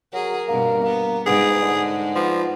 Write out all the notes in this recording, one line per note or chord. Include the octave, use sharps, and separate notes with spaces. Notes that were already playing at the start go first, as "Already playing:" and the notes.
F#3 G#4 A#4
G2 B2 A#3
A#3 B3
G#2 B3 G#4
D3
F3 B3